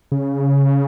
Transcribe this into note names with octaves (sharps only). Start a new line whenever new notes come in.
C#3